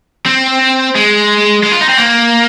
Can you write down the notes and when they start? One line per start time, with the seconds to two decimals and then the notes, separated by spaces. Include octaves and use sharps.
0.26 C4
0.95 G#3
1.63 G#3
1.72 F4
1.81 D#4
1.89 C4
1.98 A#3